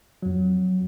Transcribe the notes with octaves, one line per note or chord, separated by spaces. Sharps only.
F2 F#3